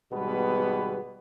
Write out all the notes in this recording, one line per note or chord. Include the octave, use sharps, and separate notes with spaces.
G#1 B2 G3 G#3 B3 B4